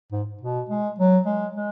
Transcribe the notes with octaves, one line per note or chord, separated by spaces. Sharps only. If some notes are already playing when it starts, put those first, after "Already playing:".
G#2
B2
G#3
F#3
G#3
G#3